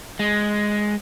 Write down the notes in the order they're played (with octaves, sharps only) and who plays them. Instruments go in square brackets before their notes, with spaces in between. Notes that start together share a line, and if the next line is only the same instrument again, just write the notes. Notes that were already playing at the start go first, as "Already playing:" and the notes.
[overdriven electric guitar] G#3